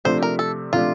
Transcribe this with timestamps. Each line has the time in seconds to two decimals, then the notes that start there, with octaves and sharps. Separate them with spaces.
0.05 C3 F3 A3 D4 C5
0.22 A#4
0.39 A4
0.73 C3 F3 A3 D4 F4